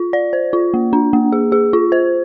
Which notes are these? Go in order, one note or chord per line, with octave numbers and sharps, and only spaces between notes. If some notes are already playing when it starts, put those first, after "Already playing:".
Already playing: F4
D5
C5
F4
A#3
D4
A#3
G#4
G#4
F4
C5